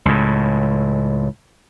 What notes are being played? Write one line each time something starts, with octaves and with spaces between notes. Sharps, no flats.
C#2 A2